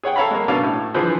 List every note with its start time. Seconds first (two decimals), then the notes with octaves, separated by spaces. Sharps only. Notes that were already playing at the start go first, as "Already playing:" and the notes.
0.03 G#4 C#5 F#5 G5
0.16 A4 C#5 F5 A#5 B5
0.31 G#3 A#3
0.48 B2 C#4 D4 A4 F5
0.63 A2
0.94 D3 E3 F3 G#4 B4 C5